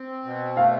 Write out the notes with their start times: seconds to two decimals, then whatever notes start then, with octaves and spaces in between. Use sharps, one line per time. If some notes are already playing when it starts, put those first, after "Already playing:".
Already playing: C4
0.25 B2
0.56 A3 F5